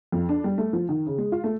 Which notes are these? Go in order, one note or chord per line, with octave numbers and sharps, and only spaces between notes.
F2
D4
G3
A3
F3
D#3
C#3
G#3
F4
A3